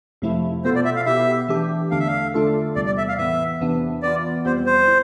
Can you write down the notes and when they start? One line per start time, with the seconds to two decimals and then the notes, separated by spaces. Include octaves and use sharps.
0.22 F2 C3 F3 A3 E4
0.65 B2 B3 F4 A4 C5
0.75 D5
0.85 E5
0.96 F5
1.06 B2 B3 E4 G4 E5
1.48 E3 A3 D4 G4
1.91 E2 D3 A3 D4 F5
2.00 E5
2.07 F5
2.34 D3 A3 D4 F4 A4
2.76 E2 C3 G3 D5
2.86 D5
2.98 E5
3.08 F5
3.18 A2 E3 B3 E5
3.61 E2 C3 E3 B3 D4
4.03 E3 B3 F4 D5
4.45 F2 C3 G3 B3 C5
4.66 C5
4.88 A2